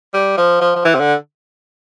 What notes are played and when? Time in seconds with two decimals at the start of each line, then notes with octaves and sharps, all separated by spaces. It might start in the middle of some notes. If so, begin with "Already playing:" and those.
0.14 G3
0.37 F3
0.61 F3
0.76 F3
0.85 E3
0.95 C3
1.00 D3